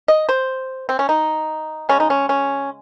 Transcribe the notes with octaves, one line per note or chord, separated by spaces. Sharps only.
D#5
C5
C4
C#4
D#4
C#3 G#3 C#4
D#4
C#4
C#4